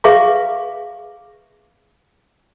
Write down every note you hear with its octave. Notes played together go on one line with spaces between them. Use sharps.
G#4 B4 E5 F5 C#6 D6